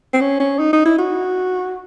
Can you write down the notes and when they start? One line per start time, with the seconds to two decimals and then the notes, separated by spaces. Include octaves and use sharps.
0.14 C4
0.21 C#4
0.40 C#4
0.59 D#4
0.72 D#4
0.85 E4
0.98 F#4